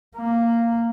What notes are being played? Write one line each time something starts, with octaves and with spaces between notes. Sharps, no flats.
A#3